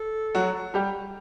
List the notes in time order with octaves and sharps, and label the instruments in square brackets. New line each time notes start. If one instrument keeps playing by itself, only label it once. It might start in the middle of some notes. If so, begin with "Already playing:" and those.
Already playing: [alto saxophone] A4
[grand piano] F#3 F#4
G3 G4